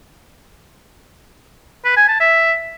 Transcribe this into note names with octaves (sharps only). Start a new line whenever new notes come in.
B4
G#5
A5
E5